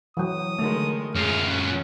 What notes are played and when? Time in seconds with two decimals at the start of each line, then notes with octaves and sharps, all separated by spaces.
0.17 E3 F#3 D#6
0.59 D3 D#3 G#3 A3
1.15 F#2 G#3 F4 G#4 F6
1.48 C#4 F#6